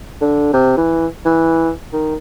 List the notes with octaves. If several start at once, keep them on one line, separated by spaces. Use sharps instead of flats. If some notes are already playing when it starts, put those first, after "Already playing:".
D3
C3
E3
E3
D#3